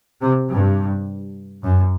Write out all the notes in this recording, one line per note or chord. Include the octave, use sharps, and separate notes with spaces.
C3
G2
F#2